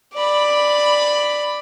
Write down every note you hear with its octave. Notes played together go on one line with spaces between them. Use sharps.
D5 B5